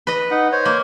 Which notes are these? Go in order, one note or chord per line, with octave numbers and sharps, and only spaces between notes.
B4 D#5
D#4 F#5
C5 C#5
A#3